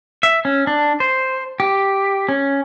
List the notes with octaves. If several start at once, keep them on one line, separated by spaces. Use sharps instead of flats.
E5
C#4
D4
C5
G4
C#4